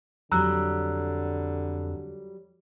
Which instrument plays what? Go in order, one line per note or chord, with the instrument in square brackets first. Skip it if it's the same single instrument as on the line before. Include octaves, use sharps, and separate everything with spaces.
[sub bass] F2 [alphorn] D3 [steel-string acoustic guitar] F#3 G3 [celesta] A#5 E6 F#6